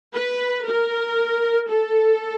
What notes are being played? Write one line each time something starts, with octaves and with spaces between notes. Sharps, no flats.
B4
A#4
A4